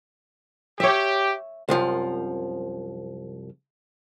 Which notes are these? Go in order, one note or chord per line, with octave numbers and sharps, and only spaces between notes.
G4 C#5 E5
C2 F#2 F3